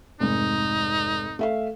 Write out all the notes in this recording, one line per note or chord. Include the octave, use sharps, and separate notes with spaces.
F1 G#2 D#4
A3 E5 F5